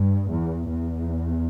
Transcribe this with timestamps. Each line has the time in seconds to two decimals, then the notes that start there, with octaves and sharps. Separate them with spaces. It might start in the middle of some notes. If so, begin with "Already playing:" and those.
Already playing: G2
0.30 E2
0.69 E2